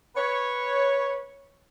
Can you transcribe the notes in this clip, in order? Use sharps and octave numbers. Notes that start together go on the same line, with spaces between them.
B4 C#5